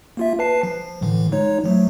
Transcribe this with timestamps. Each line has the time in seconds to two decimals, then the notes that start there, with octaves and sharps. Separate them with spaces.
0.17 A#3 F4 E5
0.39 B4 A5 C7
0.63 F3
1.02 A2 D3 E3
1.32 G#3 D#4 C#5
1.64 F3 F#3 A3